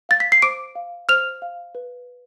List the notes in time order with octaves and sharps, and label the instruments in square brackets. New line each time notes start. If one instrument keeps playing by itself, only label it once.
[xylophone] F5 A6
B6
C7
C5 D6 D7
F5
C5 F6 F7
F5
B4